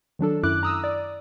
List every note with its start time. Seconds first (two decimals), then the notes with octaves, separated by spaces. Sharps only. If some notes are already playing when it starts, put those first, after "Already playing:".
0.19 D#3 F#3 D4 A4
0.43 F#2 E4 D6 F#6
0.63 A#5 D#6 E6
0.84 D5